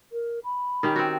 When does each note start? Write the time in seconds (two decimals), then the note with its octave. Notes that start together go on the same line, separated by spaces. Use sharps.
0.12 A#4
0.44 B5
0.83 D#3 C#4 G4
0.96 C4 F#4